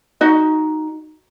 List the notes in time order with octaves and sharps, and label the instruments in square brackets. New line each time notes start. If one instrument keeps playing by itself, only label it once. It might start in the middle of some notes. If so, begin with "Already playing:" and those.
[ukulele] D#4 F#4 D#5